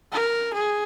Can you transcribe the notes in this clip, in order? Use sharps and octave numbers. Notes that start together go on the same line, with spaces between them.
A#4
G#4